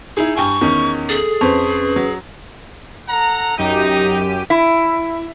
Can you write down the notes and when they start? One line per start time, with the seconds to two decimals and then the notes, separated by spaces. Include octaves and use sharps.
0.17 D#4 E4 G#4
0.37 G2 G5 G#5 C#6
0.61 E2 D#3 C#4
1.09 G#4 A4
1.41 F2 C#4 B4 C5
1.96 F#3
3.09 A4 F#5 A#5
3.58 F#2 D#4 G4 D#7
4.50 E4